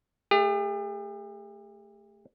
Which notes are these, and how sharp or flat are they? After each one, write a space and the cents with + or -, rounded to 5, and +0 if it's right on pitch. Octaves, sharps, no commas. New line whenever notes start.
A3 +0 G4 +45